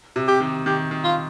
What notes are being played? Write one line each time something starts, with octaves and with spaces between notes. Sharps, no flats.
C3
G4
D#3
D#3 G4
D#3
F4